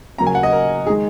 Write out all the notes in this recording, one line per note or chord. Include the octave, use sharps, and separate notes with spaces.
C#3 F#3 A#3 A#5
G#5
F#5
D#5
A#4
D#3 G#3 G#4